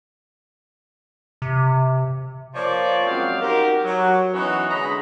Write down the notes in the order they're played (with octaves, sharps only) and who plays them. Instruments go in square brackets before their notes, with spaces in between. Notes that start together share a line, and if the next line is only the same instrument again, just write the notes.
[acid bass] C3
[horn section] F3 A#3 F4 C#5 D5
F#2 F#3 G#3 C4 F5 G5
D#4 F#4 G4 A#4
F#3
E3 F#3 B3 C#4 D#4 F#4
D3 G#3 D#5 A#5 B5